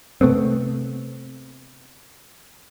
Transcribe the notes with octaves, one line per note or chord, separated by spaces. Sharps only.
C3 A3 B3 C4